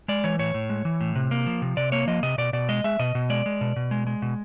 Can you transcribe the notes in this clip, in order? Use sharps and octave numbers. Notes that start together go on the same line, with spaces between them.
G#3 D5
E3 C#5
A2 C#5
A2
G#3
E3
A2
C3
A#3
F3
C3
C3 D5
A#3 C#5
F3 D#5
C3 D#5
B2 D5
B2 D5
G#3 D#5
G#3 E5
B2 D#5
B2
G#3 D5
G#3
B2
B2
G#3
G#3
B2